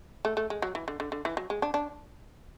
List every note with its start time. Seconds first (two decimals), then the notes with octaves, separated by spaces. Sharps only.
0.25 A3
0.37 A3
0.50 G#3
0.62 F#3
0.75 E3
0.88 D3
1.00 D3
1.12 D3
1.25 E3
1.37 F#3
1.50 G#3
1.62 D4
1.74 D4